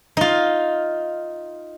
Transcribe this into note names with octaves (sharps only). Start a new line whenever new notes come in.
D#4 F4